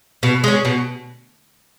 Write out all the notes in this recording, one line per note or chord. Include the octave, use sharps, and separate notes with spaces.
B2
G#3 C#4
B2